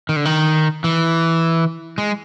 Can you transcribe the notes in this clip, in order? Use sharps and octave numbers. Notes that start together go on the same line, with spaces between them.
D#3
D3
D#3
E3
G#3